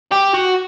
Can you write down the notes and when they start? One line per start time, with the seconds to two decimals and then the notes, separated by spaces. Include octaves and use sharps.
0.12 G4
0.34 F#4